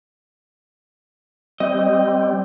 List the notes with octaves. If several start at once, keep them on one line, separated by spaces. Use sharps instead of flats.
G3 C4 D#5